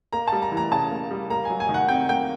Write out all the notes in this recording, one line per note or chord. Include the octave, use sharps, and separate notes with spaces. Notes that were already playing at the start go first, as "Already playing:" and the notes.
A#3 A#5
G3 A5
A#5
E3
A#5
C#3 A5
A#3
G3
A#3 A#5
F#3 G#5
G#5
D#3
F#5
C3 G5
A#3 G5